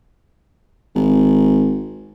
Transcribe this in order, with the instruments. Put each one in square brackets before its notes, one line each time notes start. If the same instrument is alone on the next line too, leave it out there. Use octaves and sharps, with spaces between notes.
[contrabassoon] G#1